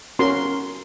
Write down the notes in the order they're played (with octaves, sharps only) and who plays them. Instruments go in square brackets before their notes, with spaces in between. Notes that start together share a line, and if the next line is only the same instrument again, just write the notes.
[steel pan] C#4 F#4 A#4 C6